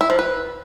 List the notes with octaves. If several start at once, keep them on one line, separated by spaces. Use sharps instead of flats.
E4
F3
B4